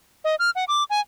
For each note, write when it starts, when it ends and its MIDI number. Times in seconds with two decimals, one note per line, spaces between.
0.24 0.35 75
0.39 0.50 89
0.55 0.65 78
0.68 0.84 86
0.90 1.00 80